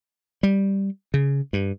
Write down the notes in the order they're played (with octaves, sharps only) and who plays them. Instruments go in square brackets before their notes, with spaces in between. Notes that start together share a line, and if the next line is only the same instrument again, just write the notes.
[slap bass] G3
C#3
G2